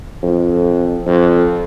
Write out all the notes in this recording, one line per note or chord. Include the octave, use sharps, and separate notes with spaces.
F2
F2